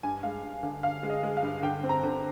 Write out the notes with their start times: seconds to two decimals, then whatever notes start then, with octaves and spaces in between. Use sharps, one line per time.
0.03 G2 G#5
0.23 G#3 F5
0.43 G2
0.63 D3 F5
0.83 D3 F5
1.03 G#3
1.10 D#5
1.23 G#3
1.37 F5
1.43 G2
1.63 D3 G5
1.83 C4
1.89 A#5
2.03 D3